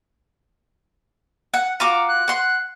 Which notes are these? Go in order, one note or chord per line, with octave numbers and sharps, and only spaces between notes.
F#5
F4 F#4 A#5 D6
F#6
F#5 C6